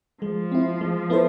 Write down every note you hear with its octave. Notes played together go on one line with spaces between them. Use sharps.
F3 G#3
C4 E4
G#3
B3 E4 A4 C5